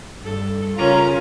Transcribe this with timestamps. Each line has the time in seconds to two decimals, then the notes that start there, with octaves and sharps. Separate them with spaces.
0.24 G2 A4
0.78 C#3 C#4 F4 A#4 A#5